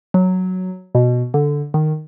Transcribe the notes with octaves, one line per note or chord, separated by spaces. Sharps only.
F#3
B2
D3
D#3